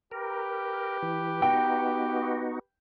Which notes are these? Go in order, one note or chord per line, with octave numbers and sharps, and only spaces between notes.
G4 A#4 B4
E3
B3 D#4 F#4 G5